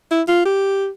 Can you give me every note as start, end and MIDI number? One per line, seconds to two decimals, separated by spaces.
0.11 0.22 64
0.28 0.45 65
0.45 0.88 67